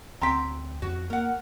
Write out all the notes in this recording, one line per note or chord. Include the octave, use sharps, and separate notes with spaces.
D2 C4 G5 A#5 C6 B6
F2 F#4
A#3 A#4 F#5